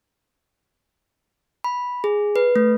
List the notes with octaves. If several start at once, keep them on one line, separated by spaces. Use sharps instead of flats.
B5
G#4
B4
A3